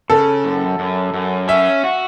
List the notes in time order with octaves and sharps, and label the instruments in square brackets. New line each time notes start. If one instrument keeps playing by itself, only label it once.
[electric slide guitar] C#3 [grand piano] A4
[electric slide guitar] F#2
F#2
F#2
[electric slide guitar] C#4 [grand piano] E5
[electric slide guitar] F#4